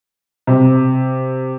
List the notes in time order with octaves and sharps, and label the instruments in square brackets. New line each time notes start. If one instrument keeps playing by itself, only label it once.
[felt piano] C3